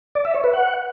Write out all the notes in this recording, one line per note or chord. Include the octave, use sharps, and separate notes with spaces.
D5
E5
C#5
B4
F#5